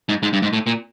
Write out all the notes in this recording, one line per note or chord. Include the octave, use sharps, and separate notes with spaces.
G#2
G#2
G2
G#2
A2
A#2